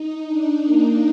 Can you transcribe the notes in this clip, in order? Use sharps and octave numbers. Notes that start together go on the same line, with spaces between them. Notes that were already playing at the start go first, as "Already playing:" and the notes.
Already playing: D#4
D4
A#3